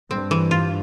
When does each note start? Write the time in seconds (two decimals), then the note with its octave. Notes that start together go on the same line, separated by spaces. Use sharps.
0.10 G2 C4
0.31 E3
0.51 F4